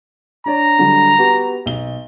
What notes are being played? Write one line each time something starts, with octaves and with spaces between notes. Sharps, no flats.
D4 C#5 D5 A#5
D3 F#3 G3
B3 F#4 G4
B1 G7